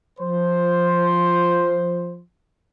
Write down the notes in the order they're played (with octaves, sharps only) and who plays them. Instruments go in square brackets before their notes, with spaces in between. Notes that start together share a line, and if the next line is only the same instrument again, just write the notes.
[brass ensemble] F3 C5